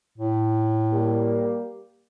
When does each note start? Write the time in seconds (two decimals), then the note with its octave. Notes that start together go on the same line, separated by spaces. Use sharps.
0.18 A2
0.92 G3 A#3 G4